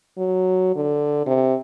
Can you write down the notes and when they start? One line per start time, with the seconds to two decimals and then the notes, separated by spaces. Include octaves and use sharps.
0.18 F#3
0.75 D3
1.26 C3